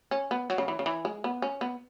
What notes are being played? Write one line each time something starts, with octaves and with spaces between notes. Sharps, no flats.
C#4
B3
F#3
C#3
E3
C#3
E3
G#3
B3
C#4
B3